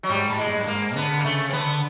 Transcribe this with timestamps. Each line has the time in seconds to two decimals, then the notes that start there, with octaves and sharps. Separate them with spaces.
0.03 F#3
0.09 G#2 G3
0.29 A2
0.38 G#3
0.48 G2
0.60 G2
0.67 G#2 A#3
0.96 D3 B3
1.19 A#3
1.24 C#3 A3
1.50 C4
1.53 D3 B3